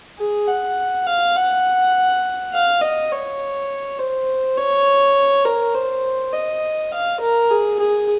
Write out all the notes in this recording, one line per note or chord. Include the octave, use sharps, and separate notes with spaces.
G#4
F#5
F5
F#5
F5
D#5
C#5
C5
C#5
A#4
C5
D#5
F5
A#4
G#4
G#4